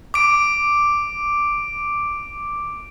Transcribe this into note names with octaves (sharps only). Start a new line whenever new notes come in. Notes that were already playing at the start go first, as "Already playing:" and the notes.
D6 D7